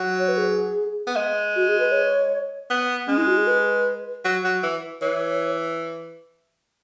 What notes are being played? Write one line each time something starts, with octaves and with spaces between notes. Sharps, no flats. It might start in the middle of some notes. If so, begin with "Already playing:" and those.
Already playing: F#3
C#5
B4
G#4
B3
G#3
F#4
G#4
B4
C#5
B3
G#3 C#4
E4
F#4
G#4
B4
F#3
F#3
E3
E3 C#5